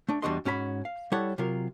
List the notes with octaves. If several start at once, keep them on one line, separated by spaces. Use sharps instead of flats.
A3 D4
E2 G3 D4 F#4 D#5 C6
G#2 C#4 F#4 A4 B5
F5
G3 E4 A4 C#5 F#5
C3 F#3 F4 A#4